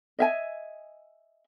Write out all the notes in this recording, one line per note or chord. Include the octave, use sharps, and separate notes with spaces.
D#5 E5 G#5